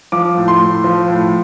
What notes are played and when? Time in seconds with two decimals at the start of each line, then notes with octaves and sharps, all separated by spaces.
0.12 F3 D6
0.37 A2
0.48 C6
0.61 A2
0.84 F3
1.08 A2